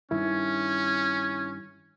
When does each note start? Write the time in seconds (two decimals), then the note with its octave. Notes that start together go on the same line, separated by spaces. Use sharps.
0.11 G2 D#3 C#4 E4